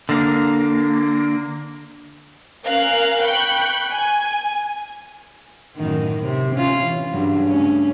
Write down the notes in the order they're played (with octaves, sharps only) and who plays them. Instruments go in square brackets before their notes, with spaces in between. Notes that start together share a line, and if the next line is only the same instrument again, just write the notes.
[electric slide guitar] D3 A#3
[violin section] C#4 A#4 F5 F6 F#6
G5 B5 C#6 F#6 G6
G#5
[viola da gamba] F#2 A2 D#3
C3
C#4 F4
E3
G2 C#3 F#3
G2 A3 C#4